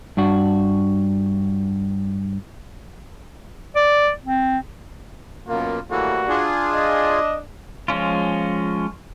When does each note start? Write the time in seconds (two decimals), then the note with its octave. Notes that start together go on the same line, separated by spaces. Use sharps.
0.17 G2 D4 F#4
3.76 D5
4.25 C4
5.48 F#2 B2 A#3 F4
5.91 A2 E3 G3 A#3 F#4
6.29 D4 F4 G#4
6.73 D#5
7.88 F3 G#3 C#4 F4